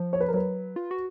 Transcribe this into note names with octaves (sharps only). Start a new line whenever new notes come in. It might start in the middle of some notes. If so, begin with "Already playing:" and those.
Already playing: F3
C#5
B4
A#4
F#3 B4
F4
F#4